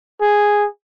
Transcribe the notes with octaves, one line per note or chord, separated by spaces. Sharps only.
G#4